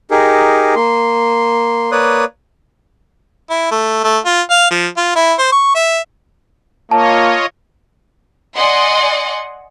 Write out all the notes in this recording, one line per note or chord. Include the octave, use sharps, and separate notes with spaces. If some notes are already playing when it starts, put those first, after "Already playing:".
D#4 G4 G#4 A#4
A#3 C6
A#3 B4 C#5 D5 D#6 F#6
E4
A3
A3
F4
F5
F3
F4
E4
C5
C#6
E5
A#3 F4 C#5 D#5 A5
D5 D#5 F#5 G#5 C6